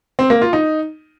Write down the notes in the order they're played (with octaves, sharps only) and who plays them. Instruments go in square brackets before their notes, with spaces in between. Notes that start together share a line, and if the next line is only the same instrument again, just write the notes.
[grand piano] C4
A#3
F4
D#4